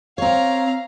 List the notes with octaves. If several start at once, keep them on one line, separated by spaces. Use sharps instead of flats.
C4 C#5 F5 A#5